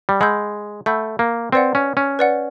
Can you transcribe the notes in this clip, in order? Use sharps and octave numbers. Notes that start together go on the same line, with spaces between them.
G3
G#3 F#5 B5 E6 G6
A3 F#5 B5 E6 G6
A#3
C4 B4 D5 F#5
C#4
C#4
B4 D5 F#5